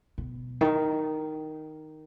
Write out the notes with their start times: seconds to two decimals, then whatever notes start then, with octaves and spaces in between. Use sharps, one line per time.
0.18 B2
0.61 D#3